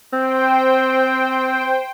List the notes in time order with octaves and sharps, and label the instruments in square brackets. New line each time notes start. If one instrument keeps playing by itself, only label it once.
[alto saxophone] C4 [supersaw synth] C5 G5